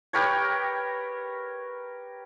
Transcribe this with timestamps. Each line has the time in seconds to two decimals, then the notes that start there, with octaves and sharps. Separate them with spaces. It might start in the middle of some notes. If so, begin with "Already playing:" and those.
0.13 G4 A#4 B4 C#5